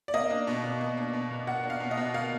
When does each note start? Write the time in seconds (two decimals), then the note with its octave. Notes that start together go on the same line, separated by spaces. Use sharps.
0.08 D5
0.14 A#3 D#5
0.30 D4
0.47 B2
0.64 B2
0.81 A#3
0.97 D4
1.13 B2
1.31 B2
1.47 A#3 F#5
1.63 D4
1.70 F5
1.80 B2
1.91 D#5
1.97 B2
2.14 A#3 F5